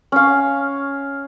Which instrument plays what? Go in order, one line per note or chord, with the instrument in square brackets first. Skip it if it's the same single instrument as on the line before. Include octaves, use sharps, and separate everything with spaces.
[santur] C#4 F5